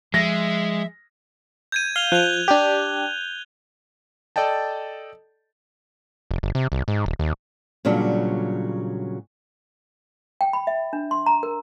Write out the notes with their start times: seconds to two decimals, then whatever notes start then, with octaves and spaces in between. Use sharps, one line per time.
0.14 F3 G#3 E5 A#6
1.72 G6 G#6 D#7
1.96 F5 F7 G7
2.12 F3 F#6 F7
2.48 D4 G4
4.36 A4 D5 D#5 G5 A5
6.31 F1
6.43 G1
6.55 C3
6.72 C2
6.88 G#2
7.06 D#1
7.19 D#2
7.85 A#2 C#3 F#3 G3 D4
10.41 G5
10.53 B5
10.67 E5
10.93 D4
11.11 C6
11.26 A#5
11.43 A#4